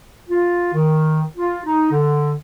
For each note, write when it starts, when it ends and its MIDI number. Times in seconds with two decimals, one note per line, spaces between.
0.29 0.73 65
0.74 1.22 51
1.38 1.59 65
1.65 1.89 63
1.91 2.33 50